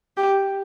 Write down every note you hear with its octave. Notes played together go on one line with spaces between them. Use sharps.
G4